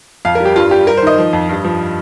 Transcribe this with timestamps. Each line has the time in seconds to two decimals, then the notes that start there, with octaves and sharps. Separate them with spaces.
0.25 F2 F5
0.35 A#4
0.40 G3
0.45 G4
0.55 G2 F4
0.71 G3 G4
0.87 G3 A#4
0.97 C5
1.02 D#3 D#5
1.18 F3
1.33 F2
1.49 G2
1.65 F3